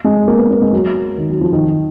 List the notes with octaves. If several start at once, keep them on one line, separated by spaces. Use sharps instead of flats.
G#3
A#3
B3
A#3
G#3
F#3
D#3
F#3
F3
D#3